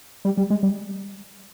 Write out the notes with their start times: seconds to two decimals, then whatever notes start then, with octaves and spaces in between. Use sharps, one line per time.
0.25 G3
0.37 G3
0.50 G#3
0.63 G3